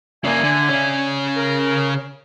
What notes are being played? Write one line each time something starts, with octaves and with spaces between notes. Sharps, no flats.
C#3 A#3 D5 E5 G#5
D3
C#3 C#4
A#4